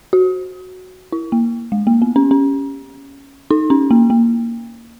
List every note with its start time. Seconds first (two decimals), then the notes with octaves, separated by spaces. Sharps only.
0.13 F#4
1.12 E4
1.32 A#3
1.72 G#3
1.87 A#3
2.02 B3
2.16 C#4
2.31 C#4
3.51 D#4
3.70 C#4
3.91 A#3
4.10 A#3